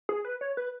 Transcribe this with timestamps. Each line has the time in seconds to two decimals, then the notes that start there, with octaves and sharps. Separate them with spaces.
0.09 G#4
0.25 B4
0.41 C#5
0.57 B4